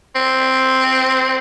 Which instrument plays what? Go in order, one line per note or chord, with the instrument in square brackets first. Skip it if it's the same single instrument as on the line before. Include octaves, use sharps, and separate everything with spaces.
[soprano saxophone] C4